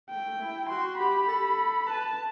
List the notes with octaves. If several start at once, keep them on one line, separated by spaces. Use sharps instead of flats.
A3 G5
E4
F#4 C6
G4 B5
A4
B4 A5